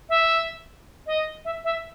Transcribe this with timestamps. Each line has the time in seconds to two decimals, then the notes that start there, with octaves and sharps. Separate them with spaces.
0.09 E5
1.07 D#5
1.45 E5
1.65 E5